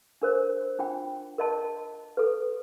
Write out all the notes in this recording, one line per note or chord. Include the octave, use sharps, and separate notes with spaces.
D4 A#4 C5
D4 F4 G5
A#4 D#5 A5
A4 B4